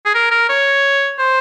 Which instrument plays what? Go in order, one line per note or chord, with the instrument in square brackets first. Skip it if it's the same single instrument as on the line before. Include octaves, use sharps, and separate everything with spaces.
[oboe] G#4
A#4
A#4
C#5
C5